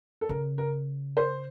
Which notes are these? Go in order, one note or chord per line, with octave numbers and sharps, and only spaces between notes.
A4
C#3 A#4
A#4
C5